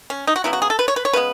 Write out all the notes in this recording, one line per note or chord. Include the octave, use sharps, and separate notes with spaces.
C#4
D#4
F#4
C#3 F#3 B3 E4
F#4
G#4
A4
B4
C#5
B4
C#5
C#3 G#3 B3 B4